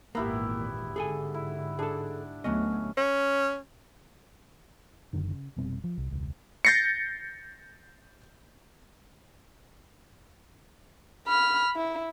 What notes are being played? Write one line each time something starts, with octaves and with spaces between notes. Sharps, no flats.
G#1 E2 A#2 A#3 B3 E4 G4
G#2 D3 G#4 A4 G#5
E4
D4 G#4 A4
D2 F#3 A3 B3 C#4 D#5
C#4
F#1 F#2 D3 D#3
C#3
F1 B2 G3 C4
F3
C2
E1 C#2
G6 A6 A#6 C7 C#7
B5 F6
E4